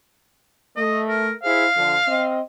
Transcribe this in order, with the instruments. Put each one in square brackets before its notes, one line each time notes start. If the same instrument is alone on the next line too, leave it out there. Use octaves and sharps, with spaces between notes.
[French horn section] A3 [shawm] D#5
[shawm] A#4
[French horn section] E4 G#4 C5 [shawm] F5
[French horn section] D3 F3
C4 D#5